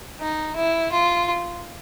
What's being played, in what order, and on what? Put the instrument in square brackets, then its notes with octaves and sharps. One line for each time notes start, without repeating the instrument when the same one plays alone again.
[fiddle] D#4
E4
F4